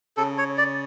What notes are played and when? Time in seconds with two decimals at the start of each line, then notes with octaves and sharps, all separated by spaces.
0.17 C#3 A4
0.38 C#5
0.58 D5